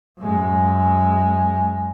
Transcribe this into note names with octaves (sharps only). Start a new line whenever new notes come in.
F#2 G#3